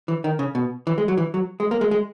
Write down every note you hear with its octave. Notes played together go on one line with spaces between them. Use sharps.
E3
D#3
C#3
B2
E3
G#3
F#3
E3
F#3
G#3
A#3
G#3
G#3